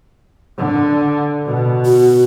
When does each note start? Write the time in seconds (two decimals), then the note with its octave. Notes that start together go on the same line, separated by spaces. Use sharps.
0.58 D3
1.47 B2
1.85 F#4